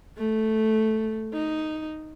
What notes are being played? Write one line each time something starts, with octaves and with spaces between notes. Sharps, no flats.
A3
D#4